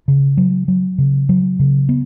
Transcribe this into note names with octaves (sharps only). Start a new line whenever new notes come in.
C#3
F#3
F#3
C#3
F#3
C#3
B3